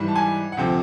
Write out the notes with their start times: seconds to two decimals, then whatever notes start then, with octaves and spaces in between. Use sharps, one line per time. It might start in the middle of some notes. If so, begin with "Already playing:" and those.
Already playing: G#2 E3 G3
0.08 A5
0.15 G#5
0.52 F#5
0.57 D2 C3 F3 G5